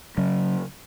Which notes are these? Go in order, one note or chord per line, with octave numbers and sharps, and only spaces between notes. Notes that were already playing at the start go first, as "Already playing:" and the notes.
C#3 F#3 C#4